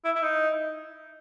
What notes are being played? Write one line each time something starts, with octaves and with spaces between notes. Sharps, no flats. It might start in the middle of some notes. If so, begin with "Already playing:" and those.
E4
E4
D#4